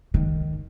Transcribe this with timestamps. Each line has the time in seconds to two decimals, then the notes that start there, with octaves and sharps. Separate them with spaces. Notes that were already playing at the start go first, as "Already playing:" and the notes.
0.14 D#3